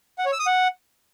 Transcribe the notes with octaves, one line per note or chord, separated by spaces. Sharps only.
F#5
C#5
E6
D#6
F#5